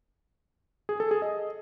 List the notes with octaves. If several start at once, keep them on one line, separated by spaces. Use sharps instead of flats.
G#4
A4
G#4
D#5